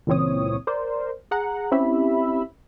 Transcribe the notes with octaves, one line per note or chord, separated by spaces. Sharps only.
C#2 A#2 E3 C4 C#5 D#6
A#4 C5 D5
G#4 F#5 A#5
C4 C#4 E4 G4 E5 B5